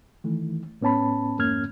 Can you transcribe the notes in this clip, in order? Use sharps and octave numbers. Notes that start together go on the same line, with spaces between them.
D#3 E3 A3
A2 B3 C#4 A5 B5
F2 G#2 A#3 C#4 F6 G#6